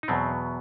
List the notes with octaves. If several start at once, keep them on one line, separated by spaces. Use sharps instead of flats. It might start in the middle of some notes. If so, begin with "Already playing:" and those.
D#4
E2 B2 F#3 B3 C4